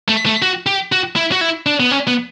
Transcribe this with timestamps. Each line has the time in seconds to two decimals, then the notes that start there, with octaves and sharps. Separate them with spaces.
0.09 A3
0.26 A3
0.42 F#4
0.66 G4
0.92 F#4
1.16 E4
1.32 F#4
1.41 E4
1.66 D4
1.80 B3
1.91 C#4
2.08 B3